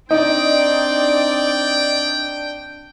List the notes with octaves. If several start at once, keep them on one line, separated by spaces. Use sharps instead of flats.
C4 D4 D#4 D5 G5